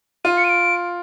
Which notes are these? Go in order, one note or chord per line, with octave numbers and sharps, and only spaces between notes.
F4 D#7
C#7
D#7
D7